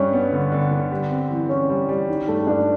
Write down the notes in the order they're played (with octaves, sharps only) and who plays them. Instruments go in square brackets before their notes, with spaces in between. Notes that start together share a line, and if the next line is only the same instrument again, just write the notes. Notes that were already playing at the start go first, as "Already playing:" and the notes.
Already playing: [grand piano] G2 G3 [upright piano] C#4
[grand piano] B3
D3
D3
D3
G3
C4
E3
[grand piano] E3 [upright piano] C#4
[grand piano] G3
G3
D#3
[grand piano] G2 [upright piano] A3
[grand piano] G2 [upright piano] D4